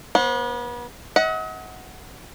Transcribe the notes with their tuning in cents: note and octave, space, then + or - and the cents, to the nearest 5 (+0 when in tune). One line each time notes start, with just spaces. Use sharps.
B3 -35 C5 +20
D#5 +40 F#5 +0